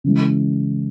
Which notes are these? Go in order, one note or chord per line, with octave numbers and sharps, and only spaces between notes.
C#3 E3 G#3